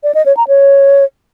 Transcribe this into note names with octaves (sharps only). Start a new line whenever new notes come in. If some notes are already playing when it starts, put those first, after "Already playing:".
D5
D#5
C#5
A#5
C#5